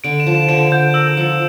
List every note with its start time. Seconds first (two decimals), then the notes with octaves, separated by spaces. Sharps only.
0.04 D3 D7
0.20 E7
0.26 F3
0.35 E7
0.49 D3 D7
0.71 D3 G6
0.94 A#4 E6
1.17 F3